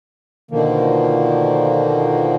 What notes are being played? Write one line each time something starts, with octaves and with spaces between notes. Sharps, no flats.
B2 D3 D#3 F3 A#3